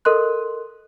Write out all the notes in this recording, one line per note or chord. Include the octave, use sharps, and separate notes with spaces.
A4 A#4 D#5 C6 F#6